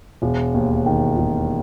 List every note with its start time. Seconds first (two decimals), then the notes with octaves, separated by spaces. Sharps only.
0.22 E1
0.54 D#2
0.86 D#3
1.17 E1